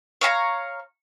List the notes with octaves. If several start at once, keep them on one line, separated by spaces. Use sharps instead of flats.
C#5 F5 A5 A#5